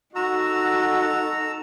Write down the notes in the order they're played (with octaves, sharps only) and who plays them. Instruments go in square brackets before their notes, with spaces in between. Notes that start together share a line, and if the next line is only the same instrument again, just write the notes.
[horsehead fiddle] D#4 A4 [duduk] F#4 [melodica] A#5 E6